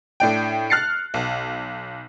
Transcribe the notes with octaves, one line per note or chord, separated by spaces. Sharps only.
A2 D4 G5
F6 F#6 A6 C7 C#7
B1